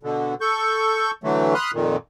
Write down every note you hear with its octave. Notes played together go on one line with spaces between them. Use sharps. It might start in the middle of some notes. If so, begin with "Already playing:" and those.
B2 D3
A4 C#6 G6
D3 E3 F#3 A3
B5 C6 D#6 F6 F#6
F2 A#2 D#3